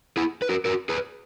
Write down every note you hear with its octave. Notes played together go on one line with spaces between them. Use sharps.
E4 G#4
B4
F#4 A#4
F#4 A#4
G#4 B4